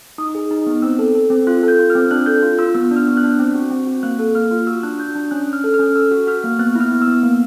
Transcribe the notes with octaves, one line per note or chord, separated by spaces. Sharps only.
D#4 D#6
G#4
D#4
B3
C4 E6
A4
A4
C4
F4 F#6
A4
G6
F4
F6
C4
D4 F#6
A4 G6
F4
F4 E6
B3 E6
D4
F6
B3
F#6
D4
C4
F#4
C4
F#4
A#3 F#6
A4
A#3 F6
F4
F#4 E6
D4 F#6
F#4 G6
D4
C#4 F#6
C#4
F6
A4
F6
C#4
A4 E6
F#4
F#4 F6
A#3
B3 F#6
E4
F6
B3
E6
B3
A#3